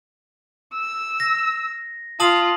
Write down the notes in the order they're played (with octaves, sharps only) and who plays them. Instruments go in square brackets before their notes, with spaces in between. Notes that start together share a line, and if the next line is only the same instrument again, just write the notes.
[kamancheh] E6
[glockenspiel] A#6
[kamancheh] F4 [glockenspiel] A5 D#6 F#7